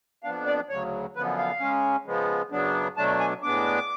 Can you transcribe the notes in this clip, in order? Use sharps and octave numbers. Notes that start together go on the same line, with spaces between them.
F2 F3 B3 D4 F5
D5
D2 C#3 F#3 C#5
F#2 D3 F3 B3 B4
F5
C#3 G#3 C#4
C#3 F3 G#3 B3
F#2 C#3 F#3 B3 D4
B2 F#3 A3 D4 A5
G#5
A2 G#3 B3 D4 D6